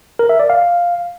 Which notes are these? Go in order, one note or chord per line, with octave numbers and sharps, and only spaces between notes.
A#4
E5
D5
F5